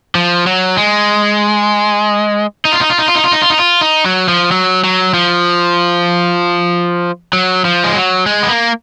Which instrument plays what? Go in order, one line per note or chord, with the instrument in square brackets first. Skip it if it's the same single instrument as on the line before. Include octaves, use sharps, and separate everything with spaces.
[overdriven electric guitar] F3
F#3
G#3
D#4
F4
D#4
F4
D#4
F4
D#4
F4
D#4
F4
D#4
F4
D#4
F#3
F3
F#3
F#3
F3
F#3
F3
G#3
F#3
G#3
B3
A#3